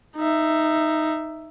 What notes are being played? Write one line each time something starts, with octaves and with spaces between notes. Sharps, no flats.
D#4 E5